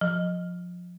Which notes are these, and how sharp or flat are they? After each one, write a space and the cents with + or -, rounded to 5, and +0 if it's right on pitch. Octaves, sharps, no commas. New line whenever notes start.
F3 +25